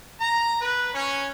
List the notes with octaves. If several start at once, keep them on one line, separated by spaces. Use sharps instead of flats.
A#5
B4
C#4